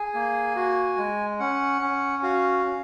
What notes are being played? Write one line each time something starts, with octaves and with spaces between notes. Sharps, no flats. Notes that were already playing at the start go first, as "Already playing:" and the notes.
Already playing: G#4 G#5
A#3
F#4
G#3
C#4 F#5
C#4
F#4 F5
C#4